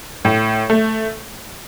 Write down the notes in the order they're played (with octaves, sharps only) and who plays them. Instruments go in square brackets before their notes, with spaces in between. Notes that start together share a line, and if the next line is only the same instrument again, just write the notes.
[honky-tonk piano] A2
A3